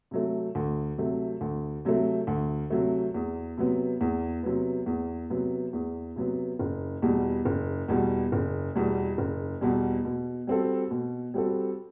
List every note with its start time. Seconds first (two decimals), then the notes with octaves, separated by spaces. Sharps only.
0.11 C3 F#3 A3
0.55 D2
0.98 C3 F#3 A3
1.41 D2
1.85 C3 F#3 A3
2.27 D2
2.70 C3 F#3 A3
3.14 E2
3.58 C3 F#3 B3
4.01 E2
4.43 C3 F#3 B3
4.86 E2
5.30 C3 F#3 B3
5.73 E2
6.16 C3 F#3 B3
6.59 F#1
7.02 E2 B2 G3
7.45 F#1
7.88 E2 B2 G3
8.32 F#1
8.75 E2 B2 G3
9.18 F#1
9.61 E2 B2 G3
10.05 B2
10.47 G3 C4 F#4 A4
10.91 B2
11.34 G3 C4 F#4 A4